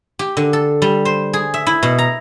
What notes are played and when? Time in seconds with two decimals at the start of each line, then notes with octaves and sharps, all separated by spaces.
0.19 G4
0.37 D3
0.53 A4
0.82 G3
1.05 C5
1.33 G#4
1.54 E5
1.67 E4
1.83 B2
1.99 A#5